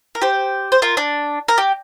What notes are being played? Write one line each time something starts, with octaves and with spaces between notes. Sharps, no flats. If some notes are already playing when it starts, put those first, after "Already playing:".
A#4
G4 C5
C5
F4 A#4
D4
A#4
G4